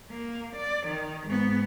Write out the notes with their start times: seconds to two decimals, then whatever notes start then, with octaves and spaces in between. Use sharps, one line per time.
0.11 A#3
0.56 D5
0.87 D#3
1.27 G#2 B3